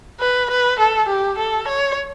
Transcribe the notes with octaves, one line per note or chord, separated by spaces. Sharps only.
B4
B4
A4
G4
A4
C#5